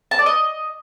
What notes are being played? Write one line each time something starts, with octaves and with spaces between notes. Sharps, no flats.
A5
D5
D#5